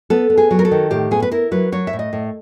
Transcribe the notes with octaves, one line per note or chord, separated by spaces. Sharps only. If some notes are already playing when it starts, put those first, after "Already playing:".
B3 A4
B3
G#4
F#3
A#4
A4
D#3
A2 G4
B3 G#4
B4
E4 A#4
F#3 B4
F#3 C#5
E5
A2
D#5
A2